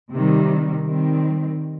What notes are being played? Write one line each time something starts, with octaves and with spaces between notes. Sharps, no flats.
C3 D#3 G3
D#3 G3 C4